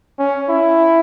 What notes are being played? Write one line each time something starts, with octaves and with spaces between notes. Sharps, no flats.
C#4
E4